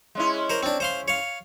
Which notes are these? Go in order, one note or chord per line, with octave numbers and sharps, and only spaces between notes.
G#3 C#4 E4
A#4 C5
C4 D4
C5 F5 C6
C#5 F5